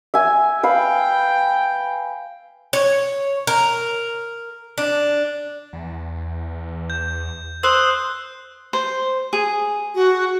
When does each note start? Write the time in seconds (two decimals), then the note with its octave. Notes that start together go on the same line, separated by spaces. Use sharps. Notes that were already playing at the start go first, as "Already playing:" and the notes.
0.14 E5 G#5
0.63 B4 F5 G5
2.73 C#5
3.47 A#4
4.78 D4
5.73 E2
6.90 G6
7.63 C5 D#6 E6 F#6
8.73 C5
9.33 G#4
9.95 F#4